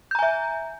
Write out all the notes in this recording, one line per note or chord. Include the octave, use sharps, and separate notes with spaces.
E5 G#5 A#5 G6